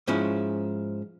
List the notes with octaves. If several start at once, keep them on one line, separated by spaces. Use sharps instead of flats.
G#2 F3 C#4 E4